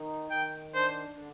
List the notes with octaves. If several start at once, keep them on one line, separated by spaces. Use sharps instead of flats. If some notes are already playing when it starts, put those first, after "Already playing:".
Already playing: D#3 D#4
D#3 G5
D4 C5
D3